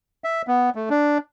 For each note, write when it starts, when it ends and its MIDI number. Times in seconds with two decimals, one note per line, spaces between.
0.24 0.42 76
0.47 0.70 59
0.75 0.89 57
0.90 1.18 62